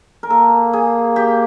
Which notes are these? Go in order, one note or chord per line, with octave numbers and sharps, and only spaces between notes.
A#4
A#3 A4
G#4
G4